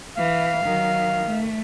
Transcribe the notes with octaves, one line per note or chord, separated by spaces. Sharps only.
E3 F5
D#3 F#3
A3